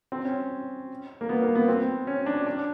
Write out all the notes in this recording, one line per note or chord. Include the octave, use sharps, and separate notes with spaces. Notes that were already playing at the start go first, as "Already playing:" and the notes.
C4
C#4
A#3
B3
A#3
B3
C4
C#4
D4
D4